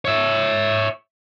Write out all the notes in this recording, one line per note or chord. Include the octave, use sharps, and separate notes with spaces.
C#5 E5